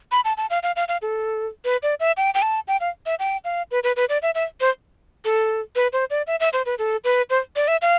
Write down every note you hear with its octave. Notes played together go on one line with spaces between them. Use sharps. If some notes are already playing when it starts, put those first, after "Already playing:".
B5
A5
A5
F5
F5
F5
F5
A4
B4
D5
E5
G5
G5
A5
G5
F5
E5
G5
F5
B4
B4
B4
D5
E5
E5
C5
A4
B4
C5
D5
E5
E5
C5
B4
A4
B4
C5
D5
E5
F5